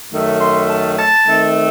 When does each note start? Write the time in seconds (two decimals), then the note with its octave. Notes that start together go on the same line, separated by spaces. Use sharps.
0.11 F#2 D#3 A3
0.39 C6
0.69 A5
0.98 A5
1.27 D#3 A3 C4